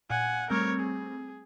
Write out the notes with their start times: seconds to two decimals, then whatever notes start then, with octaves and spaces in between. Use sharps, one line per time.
0.10 A#2 F#5 G#5
0.50 G3 A3 C4 A#4 C#5
0.80 G#4